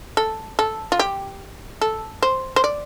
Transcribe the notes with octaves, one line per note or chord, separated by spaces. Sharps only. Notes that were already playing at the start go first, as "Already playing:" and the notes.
A4
A4
F4
G4
A4
C5
C5
D5